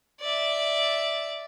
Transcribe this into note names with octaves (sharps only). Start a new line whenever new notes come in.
D5 E5